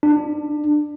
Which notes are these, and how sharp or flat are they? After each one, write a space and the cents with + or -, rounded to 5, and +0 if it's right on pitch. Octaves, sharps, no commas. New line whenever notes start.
D4 +20